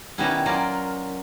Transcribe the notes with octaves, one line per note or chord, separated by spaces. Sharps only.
B2 D#3 G3 B3 C#4 E4
F#3 C#4 F4 A#4 D5